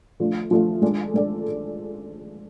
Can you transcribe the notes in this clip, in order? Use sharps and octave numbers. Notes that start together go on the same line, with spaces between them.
F3 A3 D4 F4
F3 A3 D4 F4
G#3 D4 A4 D5
G#3 D4 A4 D5